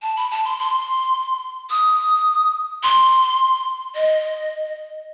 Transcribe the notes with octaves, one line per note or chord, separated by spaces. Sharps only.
A5
B5
A5
C6
C6
D#6
C6
D#5